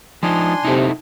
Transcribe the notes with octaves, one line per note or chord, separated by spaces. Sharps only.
F3 D4 D#4 G#5 C6
C3 D#4 E4 A4